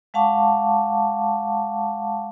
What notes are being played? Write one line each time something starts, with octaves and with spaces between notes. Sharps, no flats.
G#3 F5 F#5 A5 C#6 D6